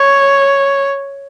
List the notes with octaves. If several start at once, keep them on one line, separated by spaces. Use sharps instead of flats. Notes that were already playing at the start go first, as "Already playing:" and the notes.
Already playing: C#5